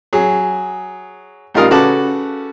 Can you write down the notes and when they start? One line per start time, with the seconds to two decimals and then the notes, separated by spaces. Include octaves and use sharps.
0.13 F#3 G#4
1.54 A1 G3 D#4 F4 A#4 D#6
1.71 C#3 F#4 A4 B4 A5 D6